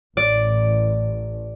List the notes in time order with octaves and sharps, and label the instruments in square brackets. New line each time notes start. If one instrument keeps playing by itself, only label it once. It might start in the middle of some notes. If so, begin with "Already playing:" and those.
[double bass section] A1 [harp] D5